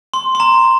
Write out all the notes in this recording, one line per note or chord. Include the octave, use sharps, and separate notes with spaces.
C6
C6
A#5